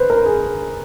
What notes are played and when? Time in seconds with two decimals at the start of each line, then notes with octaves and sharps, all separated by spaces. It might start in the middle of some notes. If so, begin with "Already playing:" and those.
Already playing: B4 C5
0.10 A#4
0.26 G#4